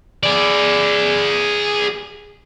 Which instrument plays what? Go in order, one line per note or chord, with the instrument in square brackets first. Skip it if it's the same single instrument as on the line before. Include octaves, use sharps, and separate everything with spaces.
[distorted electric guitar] G#4 D5